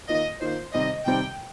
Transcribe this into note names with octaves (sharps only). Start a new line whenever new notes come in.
D#3 A#3 F4 D#5
D#3 A#3 F4 C5
C3 D#3 G3 C4 D#5
C3 D#3 G3 C4 G5